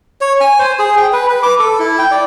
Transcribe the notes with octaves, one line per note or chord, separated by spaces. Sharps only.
C#5
G#5
C5
G#4
G5
B4
B4
D6
A4
E4
G5
D5